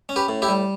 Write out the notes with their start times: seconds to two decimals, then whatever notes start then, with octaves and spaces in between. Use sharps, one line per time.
0.09 C#4
0.16 G4 B4
0.29 A2
0.42 E4 G4
0.49 G3